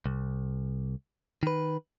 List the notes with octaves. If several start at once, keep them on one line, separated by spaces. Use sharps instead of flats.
C2
D#3 B4